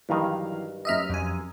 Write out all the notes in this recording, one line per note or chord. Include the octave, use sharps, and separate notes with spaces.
G2 D#3 E3 F#3 F5
F#2 D#5 E5 D#6 F6
F2 G#5